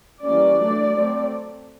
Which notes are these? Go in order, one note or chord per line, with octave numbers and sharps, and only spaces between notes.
E3 G3 A#3 C#4 D5
F#3 A3 D4
F#3 A3 C4